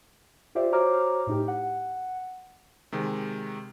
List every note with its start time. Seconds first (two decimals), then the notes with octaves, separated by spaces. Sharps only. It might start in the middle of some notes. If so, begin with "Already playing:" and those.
0.55 F4 G4 C5 D5 E5
0.72 F#4 C5 C#5 A#5 D6 F6
1.27 A2 D#4 G4
1.48 F#5
2.92 C3 D#3 G#3